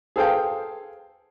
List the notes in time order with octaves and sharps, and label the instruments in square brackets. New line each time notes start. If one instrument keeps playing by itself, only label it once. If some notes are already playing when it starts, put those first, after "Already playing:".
[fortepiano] G#4 A4 C5 F5 G5